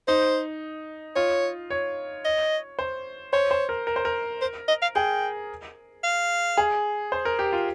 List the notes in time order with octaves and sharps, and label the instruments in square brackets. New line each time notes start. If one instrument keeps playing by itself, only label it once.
[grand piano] D#4 [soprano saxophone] C5
[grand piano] F4 [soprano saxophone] C#5
[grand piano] C#5
[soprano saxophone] D#5
[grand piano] C5
[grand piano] C5 [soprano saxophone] C#5
[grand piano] C5
A#4
A#4
C5
A#4
[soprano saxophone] C5
D#5
F5
[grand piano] G#4 [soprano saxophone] G5
[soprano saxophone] F5
[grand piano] G#4
C5
A#4
G4
F4